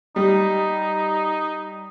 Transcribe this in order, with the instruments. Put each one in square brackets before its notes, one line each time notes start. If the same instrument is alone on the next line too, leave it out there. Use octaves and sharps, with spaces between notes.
[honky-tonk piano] G3 [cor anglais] D#4